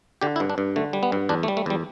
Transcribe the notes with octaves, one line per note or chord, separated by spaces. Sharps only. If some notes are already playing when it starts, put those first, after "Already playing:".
D3 G4
E4
G2
D4
G2
D3 A3
G3
B3
G2
E2 D4
A3
G3
A3
E2 G3